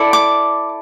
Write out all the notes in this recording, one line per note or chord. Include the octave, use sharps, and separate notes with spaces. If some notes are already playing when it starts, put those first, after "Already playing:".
Already playing: E4 A4 D5
D6